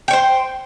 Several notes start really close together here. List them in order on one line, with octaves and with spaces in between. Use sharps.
G5 C#5 C5